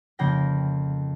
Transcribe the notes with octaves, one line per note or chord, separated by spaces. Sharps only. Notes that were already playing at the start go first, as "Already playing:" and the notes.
F2 C#3 A#3 G5 A#6